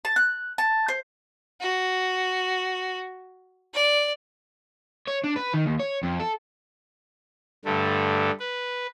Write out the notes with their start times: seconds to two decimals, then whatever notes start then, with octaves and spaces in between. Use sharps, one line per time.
0.05 A5
0.16 F#6
0.58 A5
0.88 C5
1.60 F#4
3.74 D5
5.08 C#5
5.24 D4
5.37 B4
5.54 D#3
5.66 D#2
5.80 C#5
6.03 F2
6.20 A4
7.65 G2 D3 A3
8.40 B4